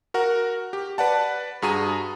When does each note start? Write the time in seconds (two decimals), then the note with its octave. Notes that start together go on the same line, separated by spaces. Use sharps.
0.14 F#4 A#4 F#5
0.73 G4
0.98 B4 D5 F#5 A5
1.62 G2 F#4 G#4 A#5 D#7